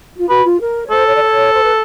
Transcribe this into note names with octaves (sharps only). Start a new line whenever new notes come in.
F4
F#4 B4
F4
A#4
C#5
A4 C5
C#5
D5
C#5
C5
B4